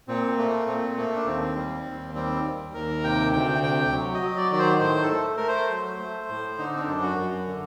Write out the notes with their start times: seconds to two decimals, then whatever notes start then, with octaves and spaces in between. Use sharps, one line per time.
0.08 A#2 C4
0.37 A3 A#3
0.66 A#2 C4
0.97 A3 A#3
1.16 D4
1.26 D#2 C4
1.56 G3
1.86 D#2
2.15 G3 C4
2.45 D#2
2.74 D#2 A#4
3.04 C3 G5
3.32 D2 G5
3.62 C3 G5
3.92 F#3
4.14 D#5
4.22 F#3
4.37 D5
4.51 D#3 D5
4.59 C5
4.80 A2 C5
5.03 A4
5.11 A3
5.37 A3 A#4
5.48 C5
5.70 F#3
5.99 A3
6.29 A2
6.58 D3 D#4
6.76 C4
6.80 D4
6.87 F#2
7.02 F#4
7.18 F#2
7.47 D3